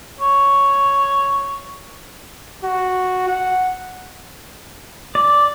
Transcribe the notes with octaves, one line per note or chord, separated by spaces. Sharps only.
C#5
F#4
F#5
D5